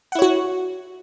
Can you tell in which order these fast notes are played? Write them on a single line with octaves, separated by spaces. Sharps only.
F#5 E4 C#5 F#4